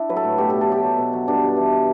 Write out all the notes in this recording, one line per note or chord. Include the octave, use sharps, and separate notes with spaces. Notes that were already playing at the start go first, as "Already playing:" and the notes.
Already playing: D4 E4
F#3 B4
A4
A2
B2 G4
B2 A4
A4
F#3 G4
F#3
B2
F#3
G2 D4
G2
E3
E3